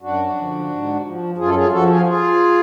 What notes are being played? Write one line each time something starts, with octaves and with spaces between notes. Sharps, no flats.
F#2 D4 F#4
D3 F3
G#2
F3
F#2 F4 G#4
A4
F4 G#4
F3 F#4 A4
F4 G#4
F4 G#4